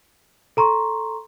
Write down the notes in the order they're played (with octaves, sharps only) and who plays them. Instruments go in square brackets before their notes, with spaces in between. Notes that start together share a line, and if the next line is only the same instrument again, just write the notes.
[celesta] A4 A#5 C6 C#6